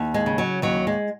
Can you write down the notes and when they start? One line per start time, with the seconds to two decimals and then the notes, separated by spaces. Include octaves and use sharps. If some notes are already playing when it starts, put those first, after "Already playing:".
Already playing: D#2
0.14 G#3
0.26 C#3
0.38 F#3
0.62 D#2 F#3
0.87 G#3